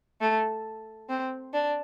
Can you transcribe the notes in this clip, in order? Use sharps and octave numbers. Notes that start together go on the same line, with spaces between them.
A3
C4
D4